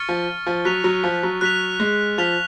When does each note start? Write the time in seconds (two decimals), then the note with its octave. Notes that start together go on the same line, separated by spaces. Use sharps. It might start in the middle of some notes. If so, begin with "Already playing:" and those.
Already playing: C#6 F6 A6 C#7
0.09 F3
0.47 F3
0.65 F#3 F#6 B6 F7
0.84 F#3
1.04 F3
1.23 F#3
1.41 F#3 F#6 B6 F7
1.80 G#3
2.18 F3 F6 B6 F7